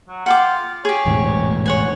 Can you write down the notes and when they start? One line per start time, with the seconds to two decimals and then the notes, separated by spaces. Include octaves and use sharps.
0.08 F#3
0.26 F4 F#5 G5 D6
0.85 G4 G#4 C#5
1.06 E1 A1 G#2
1.66 C#5 F#5 G#5